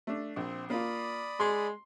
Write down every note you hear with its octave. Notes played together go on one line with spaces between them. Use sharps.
A3 D4
A#1 C4
A#3 F4 D5 B5 D#6
G#3 C6